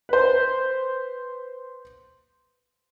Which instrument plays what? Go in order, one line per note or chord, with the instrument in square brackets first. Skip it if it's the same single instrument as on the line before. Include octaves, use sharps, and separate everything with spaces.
[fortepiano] B4 C5